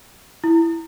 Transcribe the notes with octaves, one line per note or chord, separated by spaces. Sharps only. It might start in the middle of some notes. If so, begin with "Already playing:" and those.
E4